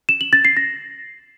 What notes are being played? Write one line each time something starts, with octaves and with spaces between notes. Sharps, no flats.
E7
F#7
A6
C7
A#6